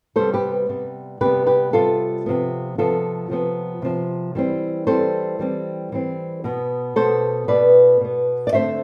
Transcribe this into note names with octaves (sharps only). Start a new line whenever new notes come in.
C3 G3 B3 A4 C5
G4 B4
C3 G3 B3
C3 G3 B3 G4 B4
G4 B4
C3 G3 B3 F4 A4
C3 F3 B3
C3 F3 B3 F4 A4
C3 F3 B3
C3 F3 B3
E3 G3 C4
E3 G3 C4 A4 C5
E3 G3 C4
E3 G3 C4
B2 B3
B2 B3 A4 C5
B2 B3 B4 D5
B2 B3
D5
D3 A3 C4 C5 E5